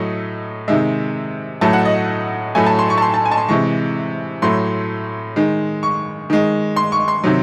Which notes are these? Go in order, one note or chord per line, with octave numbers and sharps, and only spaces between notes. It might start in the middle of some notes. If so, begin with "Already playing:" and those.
Already playing: A2 F#3 A3 D#5
C3 D#3 G#3 E5
A2 F#3 A3 A5
F#5
D#5
A2 F#3 A3 G#5
A5
C6
C#6
A5
C6
A5
G#5
A5
C6
C3 E3 G#3 C#6
A2 F#3 A3 C6
D#3 G#3
C#6
D#3 G#3
C6
C#6
C6
C3 D#3 F#3